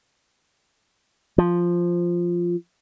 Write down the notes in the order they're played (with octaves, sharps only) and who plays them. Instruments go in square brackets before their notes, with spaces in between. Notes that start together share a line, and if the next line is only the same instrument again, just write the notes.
[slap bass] F3